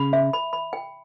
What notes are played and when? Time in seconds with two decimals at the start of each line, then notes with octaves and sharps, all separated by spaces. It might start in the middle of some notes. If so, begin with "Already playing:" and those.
Already playing: C#3 B5
0.13 E5
0.33 B5
0.53 B5
0.73 G5